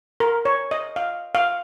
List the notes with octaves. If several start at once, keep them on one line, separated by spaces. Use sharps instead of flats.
A#4
C#5
D#5
F5
F5